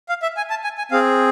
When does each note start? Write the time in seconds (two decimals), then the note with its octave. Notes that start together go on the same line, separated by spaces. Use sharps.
0.09 F5
0.22 E5
0.37 G#5
0.50 A5
0.64 G#5
0.78 G#5
0.91 C4 G#4 F5